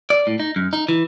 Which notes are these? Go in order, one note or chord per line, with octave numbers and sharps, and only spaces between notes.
D5
A2
D#4
F#2
D#4
E3